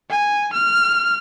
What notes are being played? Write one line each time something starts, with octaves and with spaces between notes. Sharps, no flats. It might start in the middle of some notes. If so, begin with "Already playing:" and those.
G#5
F6